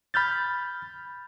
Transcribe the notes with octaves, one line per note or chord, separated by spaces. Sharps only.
B5 F6 G6 A6